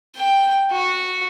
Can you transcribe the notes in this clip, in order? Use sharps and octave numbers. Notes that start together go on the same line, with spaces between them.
G5
F#4